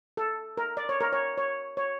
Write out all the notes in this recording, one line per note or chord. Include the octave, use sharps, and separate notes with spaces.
A4
A#4
D5
C#5
A#4
C#5
C#5
C#5